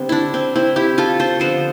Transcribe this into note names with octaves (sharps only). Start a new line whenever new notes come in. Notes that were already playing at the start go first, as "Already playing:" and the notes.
Already playing: D3 G3 B3 C4
D4 E4
C4
C4 E4
E4 G4
F4 A4
A4 C5
D3 F3 B3 A4 C5